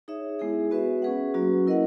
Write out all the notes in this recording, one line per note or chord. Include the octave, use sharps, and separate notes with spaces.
D#4 G#4 C#5 E5
G#3 B3 E4 G#4
B3 F#4 B4 E5
C#4 G#4 B4 F#5
F#3 A#3 C#4 F#4
E4 A#4 D#5 F#5